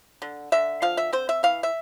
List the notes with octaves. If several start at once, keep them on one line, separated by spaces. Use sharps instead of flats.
D3
D3 E5
F3 F5
E5
C4 C5
E5
E3 F5
E5